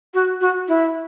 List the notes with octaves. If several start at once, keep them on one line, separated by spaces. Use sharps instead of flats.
F#4
F#4
E4